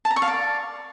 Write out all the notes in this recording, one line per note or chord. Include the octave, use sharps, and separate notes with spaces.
A5
A#5
C#6
F5
D5